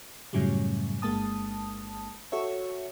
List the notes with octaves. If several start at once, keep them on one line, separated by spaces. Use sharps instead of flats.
F#2 A2 C#3 F#3 G3
G1 G#3 A#3 A5 D#6
F#4 A4 C#5 E5